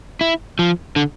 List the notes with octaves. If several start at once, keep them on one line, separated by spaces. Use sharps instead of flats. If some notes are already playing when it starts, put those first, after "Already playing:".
E4
F3
D3